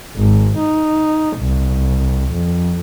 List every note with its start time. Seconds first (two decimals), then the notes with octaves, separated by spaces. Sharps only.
0.16 G#1
0.58 D#4
1.38 C2
2.32 F2